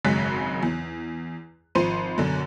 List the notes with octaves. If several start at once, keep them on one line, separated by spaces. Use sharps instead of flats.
G#1 F#2 C#3 G#3 F#6 B6
E2
G#1 F3 C5 C6 D#7
F#2 B2 D3